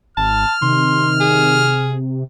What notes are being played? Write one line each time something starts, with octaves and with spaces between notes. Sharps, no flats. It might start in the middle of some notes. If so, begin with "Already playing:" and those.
G#1 A5 F6
C3 D#3 C6
G#4